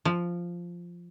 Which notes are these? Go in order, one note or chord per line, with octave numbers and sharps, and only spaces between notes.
F3